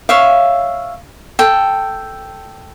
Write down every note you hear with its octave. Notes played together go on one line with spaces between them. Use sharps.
C#5 E5 F5
A4 G5